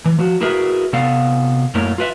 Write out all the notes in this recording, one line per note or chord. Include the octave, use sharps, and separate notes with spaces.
E3
F3 F#4
E4 F#4 G#4 A#4 B4 E5
C3 B3 A4 F5
F#2 A3 A#3 E4 A#4 C#5
F4 B4 E5